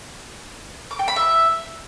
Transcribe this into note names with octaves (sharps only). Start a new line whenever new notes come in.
D6
G5
B5
E5